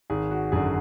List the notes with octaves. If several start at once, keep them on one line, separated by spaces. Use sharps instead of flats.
G#1 G#4
F#4
F#2 D3 G#4